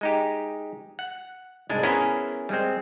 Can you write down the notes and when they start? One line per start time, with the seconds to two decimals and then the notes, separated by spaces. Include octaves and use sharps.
0.01 G#3 D#4 G4
0.99 F#5
1.69 C2 G#2 G#3 D4
1.83 B3 C#4 E4 G#4 A#4 C5
2.49 G3 G#3 C4